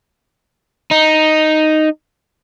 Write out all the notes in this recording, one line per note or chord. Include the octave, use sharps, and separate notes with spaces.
D#4